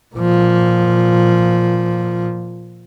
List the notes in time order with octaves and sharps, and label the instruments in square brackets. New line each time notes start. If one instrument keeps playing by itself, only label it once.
[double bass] A#2 F3